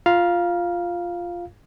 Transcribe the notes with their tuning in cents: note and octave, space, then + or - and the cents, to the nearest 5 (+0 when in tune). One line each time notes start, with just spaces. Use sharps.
F4 +0 F5 +0 A#5 +40